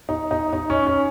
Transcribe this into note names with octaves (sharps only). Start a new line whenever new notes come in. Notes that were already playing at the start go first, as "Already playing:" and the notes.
D#4
D#4
D#4
C#4
C#4